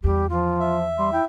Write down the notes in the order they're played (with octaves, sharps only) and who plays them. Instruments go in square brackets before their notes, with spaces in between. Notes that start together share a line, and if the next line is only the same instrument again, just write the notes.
[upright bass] E2 [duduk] G3 [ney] G4
[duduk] F3 [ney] F4
[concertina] E5
[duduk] G3 [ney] C6
[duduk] E4 [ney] G5